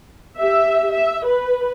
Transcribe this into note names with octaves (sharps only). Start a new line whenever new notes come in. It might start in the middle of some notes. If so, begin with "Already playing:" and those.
G4 E5
E5
B4